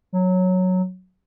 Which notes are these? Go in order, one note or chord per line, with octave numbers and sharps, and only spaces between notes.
F#3